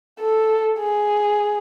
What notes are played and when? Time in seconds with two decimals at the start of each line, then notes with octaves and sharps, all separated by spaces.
0.20 A4
0.79 G#4